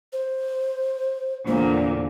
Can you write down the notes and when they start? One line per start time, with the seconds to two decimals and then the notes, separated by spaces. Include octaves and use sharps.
0.13 C5
1.48 E2 A#2 D3 C5